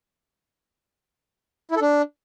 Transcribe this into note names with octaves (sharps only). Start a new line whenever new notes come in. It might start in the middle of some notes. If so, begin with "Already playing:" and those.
E4
A4
D4